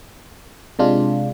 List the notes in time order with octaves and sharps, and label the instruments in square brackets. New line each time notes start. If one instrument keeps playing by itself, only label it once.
[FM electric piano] C3 G#3 D4 F4